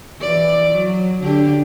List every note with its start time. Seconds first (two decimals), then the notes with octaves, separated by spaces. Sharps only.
0.20 E3 D5
0.73 F#3
1.21 D3 D4 G4